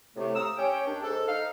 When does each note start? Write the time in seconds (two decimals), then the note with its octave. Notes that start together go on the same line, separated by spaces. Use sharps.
0.16 A2 C3 A3
0.34 F5 A#5 D#6 E6
0.57 C#4 G4 C#5 G5
0.86 D#2 D4
1.03 G#2 A4
1.28 D#4 F5